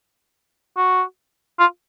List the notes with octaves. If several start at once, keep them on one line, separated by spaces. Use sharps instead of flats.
F#4
F4